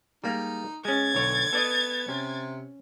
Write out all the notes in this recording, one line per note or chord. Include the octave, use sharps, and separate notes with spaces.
G3 G#3 A#3 D#4
G#3 C#4 G#6 A6
B1 D3 C#5
B3 A4 D5 D#5
C3 C#4